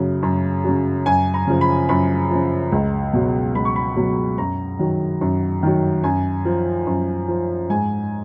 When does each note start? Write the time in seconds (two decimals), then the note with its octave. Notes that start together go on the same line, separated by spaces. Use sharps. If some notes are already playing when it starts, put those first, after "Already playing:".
Already playing: F#2 C#3 F#3
0.23 F#2
0.64 C#3 F#3
1.06 F#2 G#5
1.34 A#5
1.47 C#3 F3
1.61 B5
1.89 F#2 B5
2.31 C#3 F3
2.72 C#2
3.13 B2 F#3
3.54 C#2 B5
3.65 C#6
3.76 B5
3.96 B2 F#3
4.38 F#2 A#5
4.79 D#3 F#3
5.21 F#2
5.63 D#3 F#3
6.04 F#2 G#5
6.45 F3
6.87 F#2
7.28 F3
7.70 G#2 G#5